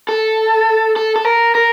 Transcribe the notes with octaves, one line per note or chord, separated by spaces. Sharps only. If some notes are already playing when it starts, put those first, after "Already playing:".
A4
A4
A4
A#4
A#4